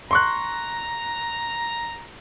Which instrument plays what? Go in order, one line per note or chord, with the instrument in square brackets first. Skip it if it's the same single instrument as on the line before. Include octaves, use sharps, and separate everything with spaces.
[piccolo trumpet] A#5 [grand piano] C6 C#6 F#6